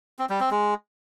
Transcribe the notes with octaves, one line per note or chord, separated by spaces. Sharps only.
C4
G3
C4
G#3